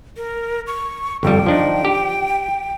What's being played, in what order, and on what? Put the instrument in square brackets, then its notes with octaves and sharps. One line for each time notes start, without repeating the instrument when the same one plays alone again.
[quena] A#4
C#6
[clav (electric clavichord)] G1 F2 G3 [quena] G5
[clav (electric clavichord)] F3 D4 D#4
G4